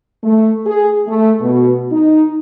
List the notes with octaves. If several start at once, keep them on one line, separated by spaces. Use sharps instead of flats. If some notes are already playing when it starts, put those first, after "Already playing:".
A3
G#4
A3
B2
D#4